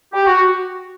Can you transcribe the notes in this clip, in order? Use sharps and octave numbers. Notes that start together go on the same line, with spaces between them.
G4
F#4